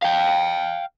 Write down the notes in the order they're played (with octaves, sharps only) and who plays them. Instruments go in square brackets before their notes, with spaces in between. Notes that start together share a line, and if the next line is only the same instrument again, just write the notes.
[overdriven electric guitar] F5 G5